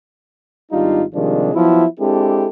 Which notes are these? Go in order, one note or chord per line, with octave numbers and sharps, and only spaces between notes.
G#1 G3 D4 D#4 F4
C3 D#3 F3 G3 G#3 D4
F3 F#3 B3 E4
G#3 C4 D4 E4 G4 A4